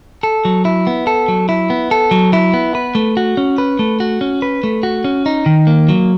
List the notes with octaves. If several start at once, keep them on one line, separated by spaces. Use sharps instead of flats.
A4
F#3
E4
B3
A4
F#3
E4
B3
A4
F#3
E4
B3
B4
A3
F#4
C#4
B4
A3
F#4
C#4
B4
A3
F#4
C#4
D#4
D#3
A#3
F#3